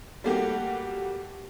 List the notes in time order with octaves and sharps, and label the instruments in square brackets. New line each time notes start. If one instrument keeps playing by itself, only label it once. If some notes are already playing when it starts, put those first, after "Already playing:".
[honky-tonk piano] G3 A3 A#3 F#4 G4